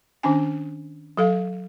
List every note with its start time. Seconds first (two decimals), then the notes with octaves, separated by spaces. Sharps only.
0.23 D#3 C#4 D4 G#5
1.17 F#3 A4 F5